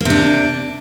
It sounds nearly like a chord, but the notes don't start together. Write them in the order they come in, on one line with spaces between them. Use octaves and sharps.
A#3 C3 D4